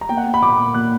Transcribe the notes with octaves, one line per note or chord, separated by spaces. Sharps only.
A#5
A#3 G5
F#5
A#3
B5
A#2 D6
A#3
A#2 F#6